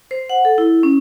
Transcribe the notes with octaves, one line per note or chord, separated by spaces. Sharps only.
C5
F#5
A4
E4
C#4